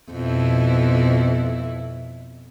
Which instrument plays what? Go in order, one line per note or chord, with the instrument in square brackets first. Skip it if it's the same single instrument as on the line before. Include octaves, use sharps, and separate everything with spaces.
[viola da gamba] F2 B2 E4